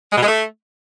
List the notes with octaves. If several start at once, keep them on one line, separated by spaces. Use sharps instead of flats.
G#3
B2
G#3
A3